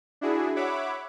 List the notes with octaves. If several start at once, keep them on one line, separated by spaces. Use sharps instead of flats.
D4 E4 F#4 G#4
C#5 E5 F#5 B5 D6